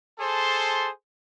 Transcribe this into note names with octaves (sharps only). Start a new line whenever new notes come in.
G#4 A4 C5 A5 C6